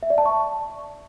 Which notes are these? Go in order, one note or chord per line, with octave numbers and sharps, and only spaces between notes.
E5
D5
A5
C#6